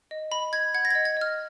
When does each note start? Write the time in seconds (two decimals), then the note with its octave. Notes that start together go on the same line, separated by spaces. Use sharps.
0.11 D#5
0.31 D#5 B5
0.53 D#5 G#6
0.74 F#5 G#6
0.85 A#6
0.91 D#5 G#6
1.05 G#6
1.17 D#5 F6